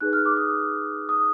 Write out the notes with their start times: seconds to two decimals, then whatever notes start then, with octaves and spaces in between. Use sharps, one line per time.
0.01 D#4 G#4 B4 F#6
0.13 F6
0.26 D6
0.37 D#6
1.09 D#6